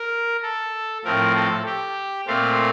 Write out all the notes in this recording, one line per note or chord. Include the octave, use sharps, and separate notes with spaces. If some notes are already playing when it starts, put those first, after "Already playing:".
Already playing: A#4
A4
A2 F3 C4 A#4
A4
G4
A#2 A3 C4 F5